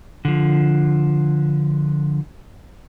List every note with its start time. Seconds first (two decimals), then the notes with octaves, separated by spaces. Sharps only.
0.25 D3 F3